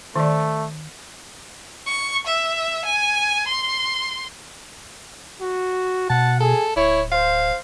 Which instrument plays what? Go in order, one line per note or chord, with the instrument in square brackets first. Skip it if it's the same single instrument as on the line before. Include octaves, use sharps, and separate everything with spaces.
[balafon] D#3 D5 [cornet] A3
[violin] C#6
E5
G#5
C6
[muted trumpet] F#4
[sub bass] B2 [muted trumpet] F#5 [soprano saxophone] A5
[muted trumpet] G#4 [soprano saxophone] A4
[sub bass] D1 [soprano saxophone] E4 [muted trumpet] C#5
[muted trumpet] C5 [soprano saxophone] F5